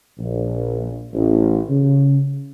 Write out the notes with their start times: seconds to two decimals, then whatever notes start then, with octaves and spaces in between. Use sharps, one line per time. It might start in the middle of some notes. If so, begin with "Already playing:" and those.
0.19 A#1
1.13 A1
1.70 C#3